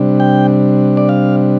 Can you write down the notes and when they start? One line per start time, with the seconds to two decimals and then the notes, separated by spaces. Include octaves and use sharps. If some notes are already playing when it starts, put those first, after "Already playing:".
Already playing: C3 G3 D4
0.20 G5
0.97 D5
1.09 F5